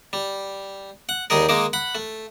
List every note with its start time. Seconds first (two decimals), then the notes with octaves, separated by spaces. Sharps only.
0.13 G3
1.09 F#5
1.30 D#2 G3 D#4 G#4 A#4
1.49 D#3 G#3 A#3 D#4 D6
1.73 F#5 B5
1.95 A3